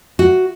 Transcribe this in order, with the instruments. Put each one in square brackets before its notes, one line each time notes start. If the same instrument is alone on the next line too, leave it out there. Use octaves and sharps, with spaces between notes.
[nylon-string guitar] F#4